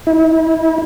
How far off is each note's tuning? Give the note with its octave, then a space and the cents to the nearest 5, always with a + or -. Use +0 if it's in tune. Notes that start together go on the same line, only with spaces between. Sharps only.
E4 -40